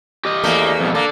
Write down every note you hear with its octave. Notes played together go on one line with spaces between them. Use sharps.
G4 D#5
E2 A3 A#3
F2 B2
A#3 A4 D5